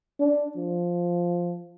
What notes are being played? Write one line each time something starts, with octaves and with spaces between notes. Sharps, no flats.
D4
F3